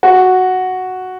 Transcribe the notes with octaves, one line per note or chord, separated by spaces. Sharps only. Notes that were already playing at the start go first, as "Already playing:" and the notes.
F#4